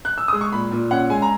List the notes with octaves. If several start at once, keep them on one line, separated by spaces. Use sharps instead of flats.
F#6
E6
G#3 D#6
C#6
A#2 B5
A#2
C#4 F#5
G#3 G#5
A#5